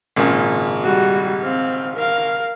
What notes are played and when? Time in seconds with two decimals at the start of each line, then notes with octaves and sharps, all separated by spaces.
0.16 G#1 A#2 C#3
0.83 G3 F#4
1.42 C4 F5
1.96 A#4 F5